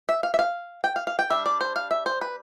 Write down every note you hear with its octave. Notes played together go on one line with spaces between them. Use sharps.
E5
F5
E5
F5
G5
F5
F5
G5
G3 D4 E5
D5
C5
F5
E5
C5
B4